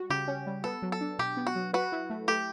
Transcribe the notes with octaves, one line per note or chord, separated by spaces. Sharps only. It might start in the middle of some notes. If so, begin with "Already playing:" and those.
Already playing: G3 F#4
C#3 G4
C#4
G3
B3 A4
F#3
A4
D4
B2 G4
B3
F#4
F#3
F#4 B4
E4
A3
A3 G4